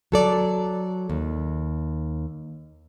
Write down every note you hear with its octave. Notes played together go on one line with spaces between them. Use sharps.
F#3 A4 D5
D#2